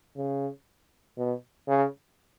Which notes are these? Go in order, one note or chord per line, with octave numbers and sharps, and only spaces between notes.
C#3
B2
C#3